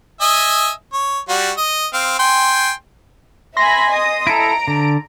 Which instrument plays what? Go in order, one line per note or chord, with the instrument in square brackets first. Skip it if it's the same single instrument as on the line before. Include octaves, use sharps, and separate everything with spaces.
[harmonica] D#5 E5 G#5
C#5
G3 F#4
D#5
C4 F5
G5 G#5 C6
[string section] E5 G#5 B5 [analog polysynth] C6 A#6
[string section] D#5 D#6
[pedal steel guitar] E4 A4 [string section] A#5 [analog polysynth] D7
[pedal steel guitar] D3